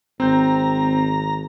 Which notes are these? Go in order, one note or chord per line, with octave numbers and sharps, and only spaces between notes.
G#1 C4 A#5 G6